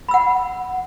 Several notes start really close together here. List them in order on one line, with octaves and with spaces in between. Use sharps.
B5 E6 F#5